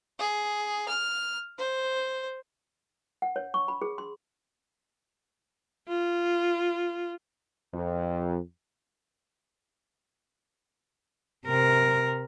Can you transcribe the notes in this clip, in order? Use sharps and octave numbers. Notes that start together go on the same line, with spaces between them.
G#4
F6
C5
F#5
C#5
C#6
B5
G#4
C6
F4
F2
C3 A#4